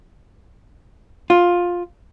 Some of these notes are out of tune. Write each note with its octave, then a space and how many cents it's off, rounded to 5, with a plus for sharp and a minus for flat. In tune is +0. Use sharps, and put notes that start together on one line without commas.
F4 +10